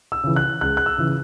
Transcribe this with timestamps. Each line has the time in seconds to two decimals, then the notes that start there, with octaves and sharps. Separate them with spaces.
0.12 E6
0.24 C#3 E3
0.36 F#6
0.61 C#2 F#6
0.77 F#6
0.86 E6
0.98 C#3 E3